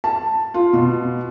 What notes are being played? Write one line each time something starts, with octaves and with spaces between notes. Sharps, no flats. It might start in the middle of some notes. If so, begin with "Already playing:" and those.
A5
F4
B2